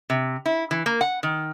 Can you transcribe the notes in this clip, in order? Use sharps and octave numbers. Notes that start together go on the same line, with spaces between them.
C3
E4
E3
A#3
F#5
D#3